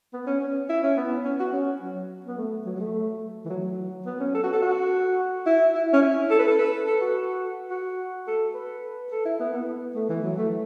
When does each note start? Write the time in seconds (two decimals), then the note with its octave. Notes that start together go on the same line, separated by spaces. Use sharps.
0.13 B3
0.27 C#4
0.41 C#4
0.69 E4
0.83 C#4
0.97 B3
1.25 C#4
1.40 F#4
1.53 C#4
1.82 F#3
2.26 B3
2.37 A3
2.66 F#3
2.76 F#3
2.80 A3
3.45 E3
3.50 F#3
4.06 B3
4.20 C#4
4.34 A4
4.43 F#4
4.53 A4
4.62 F#4
5.46 E4
5.75 E4
5.93 C#4
6.02 E4
6.30 A4
6.39 B4
6.48 A4
6.59 B4
6.87 A4
7.01 F#4
7.70 F#4
8.27 A4
8.54 B4
9.12 A4
9.25 E4
9.40 B3
9.53 B3
9.95 A3
10.09 E3
10.24 F#3
10.38 A3